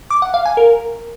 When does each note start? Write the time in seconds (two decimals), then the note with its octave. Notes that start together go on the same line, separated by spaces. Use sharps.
0.10 D6
0.22 F#5
0.34 F5
0.45 G#5
0.57 A#4